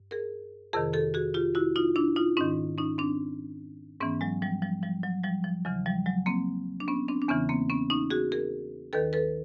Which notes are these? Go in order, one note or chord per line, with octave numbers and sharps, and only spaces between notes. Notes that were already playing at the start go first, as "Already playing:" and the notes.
Already playing: G2
G#4 A#4
F2 C3 D#3 G#4 A#4
G4 A4
F#4 G#4
F4 G4
E4 F#4
D#4 F4
D4 E4
D#4 F4
G#2 D#3 C#4 D#4
C#4 D#4
C4 D4
G#2 E3 B3 C#4
F#3 G#3
F3 G3
F3 G3
F3 G3
F#3
F3 G3
F3
E2 C#3 E3 F#3
F3 G3
F#3 G#3
A#3 C4
D4
B3 C#4
C4 D4
D4
E2 C#3 E3 B3 C#4
A#3 C4
B3 C#4
C#4 D#4
F#4 G#4
G#4 A#4
D#2 D#3 A4 B4
A4 B4